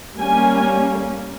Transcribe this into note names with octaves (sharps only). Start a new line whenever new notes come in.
G3 A#3 C#4 G#5